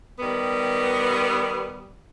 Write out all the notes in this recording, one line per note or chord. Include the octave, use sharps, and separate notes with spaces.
D#3 G3 B3